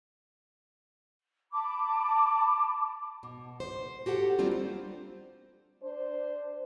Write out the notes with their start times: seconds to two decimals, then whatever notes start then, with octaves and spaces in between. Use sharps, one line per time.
1.51 A5 B5 D6
3.23 B2
3.60 C5
4.06 F#4 G4 A4 F#5
4.39 G3 A#3 C4 D4 F4
4.51 C5
5.83 D4 C5